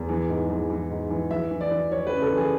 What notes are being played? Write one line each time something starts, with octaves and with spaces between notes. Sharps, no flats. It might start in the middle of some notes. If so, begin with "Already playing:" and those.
Already playing: E2
E3
G#2
E3
E3
G#2
E3
E3 E5
E3
D5
E3
E3 C#5
C#3 B4
A4
E3
G#4